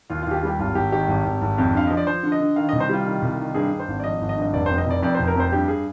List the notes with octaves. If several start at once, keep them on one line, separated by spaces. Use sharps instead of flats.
D#2 F4
F4
D#2 G4
F4
G3 G4
G#1 F4
G#1 G4
D#3 G4
G#1
G#1
G#1
F2
D3 F5
F3 D#5
D5
F3 C5
D3
D#5
D3
D#3 F5
C2 D#5
C5
G3 F4
D#3
C2
D#3
G2 G#4
G2
C5
G#1
D5
F3 D#5
G#1
D#5
G2
D#5
F1 D5
F2 C5
D#5
F1 D5
F2 D5
F1 C5
A#4
F2 C5
G2 G4
G#4